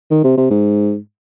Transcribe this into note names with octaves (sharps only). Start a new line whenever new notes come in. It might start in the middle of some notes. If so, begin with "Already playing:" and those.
D#3
C3
C3
G#2